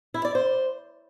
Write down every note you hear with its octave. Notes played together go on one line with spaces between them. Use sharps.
E4
D5
C5